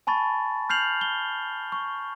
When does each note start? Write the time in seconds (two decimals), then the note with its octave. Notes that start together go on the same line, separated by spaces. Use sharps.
0.07 G#5 A5 B5 C#6 A6
0.69 F6 G6 C7 F7 F#7
1.01 G7
1.72 C#6